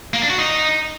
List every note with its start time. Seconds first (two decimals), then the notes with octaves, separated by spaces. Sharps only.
0.13 A#3
0.22 D4
0.30 F#4
0.38 D#4